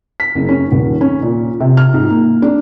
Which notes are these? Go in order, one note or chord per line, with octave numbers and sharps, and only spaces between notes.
B6
F#1
C#4
D#1
C#4
A#2
C3
F6
G#2
A#3
D4